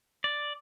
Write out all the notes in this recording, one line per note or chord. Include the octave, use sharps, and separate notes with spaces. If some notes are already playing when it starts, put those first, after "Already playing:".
D5